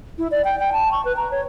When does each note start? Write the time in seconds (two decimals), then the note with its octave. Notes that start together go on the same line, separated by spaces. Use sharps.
0.18 E4
0.31 D5
0.45 G5
0.59 G5
0.73 A5
0.92 C#6
1.05 B4
1.17 A#5
1.31 C#5